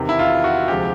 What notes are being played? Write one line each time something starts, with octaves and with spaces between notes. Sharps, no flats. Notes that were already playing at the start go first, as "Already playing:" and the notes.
Already playing: E2 C3 D#3
E4
F4
F#4
D2 C3 F3 G#3 G4